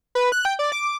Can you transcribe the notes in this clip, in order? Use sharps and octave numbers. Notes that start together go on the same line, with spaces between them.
B4
F#6
G5
D5
D6